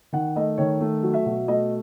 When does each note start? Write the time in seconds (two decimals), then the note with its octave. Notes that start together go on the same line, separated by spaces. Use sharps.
0.13 D#3 F#5
0.36 A3 D#5
0.58 D#3 C#5
0.80 A3
1.03 F#3
1.14 E5
1.26 B2
1.48 A3 D#5